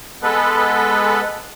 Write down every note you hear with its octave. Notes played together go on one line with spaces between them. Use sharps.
G#3 B3 A4 B4